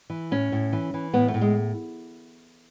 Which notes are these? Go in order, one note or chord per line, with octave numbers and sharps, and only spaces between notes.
E3
A2 C#4
A2
E3
E3
A2 B3
A3
A2
G#3